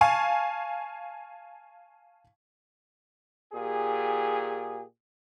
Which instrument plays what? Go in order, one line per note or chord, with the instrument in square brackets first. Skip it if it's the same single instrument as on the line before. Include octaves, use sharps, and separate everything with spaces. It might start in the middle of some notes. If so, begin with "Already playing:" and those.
[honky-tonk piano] F5 G#5 A5 C#6
[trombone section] A#2 G4 G#4